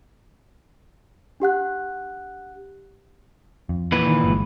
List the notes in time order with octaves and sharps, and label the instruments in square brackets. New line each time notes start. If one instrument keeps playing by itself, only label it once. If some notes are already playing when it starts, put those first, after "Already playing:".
[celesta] D4 G4 F#5 F#6
[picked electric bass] F2
[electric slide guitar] A#2 E3 B4
[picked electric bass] D#3
G1 G#3